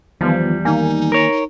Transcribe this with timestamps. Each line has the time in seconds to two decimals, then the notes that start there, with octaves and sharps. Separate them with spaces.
0.21 E2 D#3 F3 G3 B3
0.65 D#3 A#3 D#4 G#5
1.12 A#4 C#5